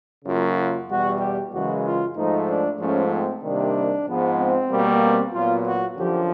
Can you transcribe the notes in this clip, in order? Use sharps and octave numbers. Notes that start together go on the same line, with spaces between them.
F#2 C#3 F#3 A#3 F4
F4
E2 B2 G3 F#4
G4
F#2 C#3 E3 G#3 F#4
F4
G#2 F3 A3 D#4
D4
G#2 F3 A3 C#4
C4
C3 D#3 G3 A#3 D4
G#2 F3 G#3 B3
C4
B2 G3 A#3
C4
A#2 F#3 B3 F4
F#4
F#2 D3 F3 G4